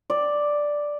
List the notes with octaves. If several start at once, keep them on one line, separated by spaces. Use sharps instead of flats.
D5